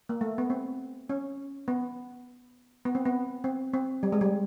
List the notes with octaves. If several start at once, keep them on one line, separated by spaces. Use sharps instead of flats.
A#3
A3
B3
C4
C#4
B3
B3
C4
B3
C4
C4
G3
G#3
G3